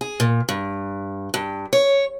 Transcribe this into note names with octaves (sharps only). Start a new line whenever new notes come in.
G#4
A#2
G2
G2
C#5